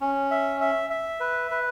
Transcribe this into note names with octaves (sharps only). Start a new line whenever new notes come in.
C#4
E5
E5
E5
B4
B4